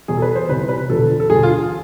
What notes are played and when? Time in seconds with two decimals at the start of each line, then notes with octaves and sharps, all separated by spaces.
0.08 E2 B2 G#4
0.17 A4
0.22 B4
0.36 C5
0.49 C2 C3 E3 B4
0.69 B4
0.89 E1 E2 D3 F3 A4
1.20 A4
1.30 E1 D2 D3 G#4
1.43 F4